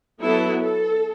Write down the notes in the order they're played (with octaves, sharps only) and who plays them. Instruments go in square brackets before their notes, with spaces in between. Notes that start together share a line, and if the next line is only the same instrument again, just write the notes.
[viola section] F#3 B3 E4 A4
A4